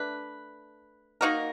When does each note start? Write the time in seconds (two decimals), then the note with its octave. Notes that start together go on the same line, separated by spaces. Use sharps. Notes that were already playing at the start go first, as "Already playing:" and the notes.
Already playing: A3 D4 B4
1.21 A#3 D#4 F#4 A#4